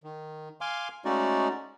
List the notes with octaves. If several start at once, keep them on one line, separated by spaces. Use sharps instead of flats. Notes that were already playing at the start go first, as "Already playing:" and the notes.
D#3
F5 G#5 C6 D6
G#3 A3 C#4 D#4 F#4 D5